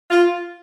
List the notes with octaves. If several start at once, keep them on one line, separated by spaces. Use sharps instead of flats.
F4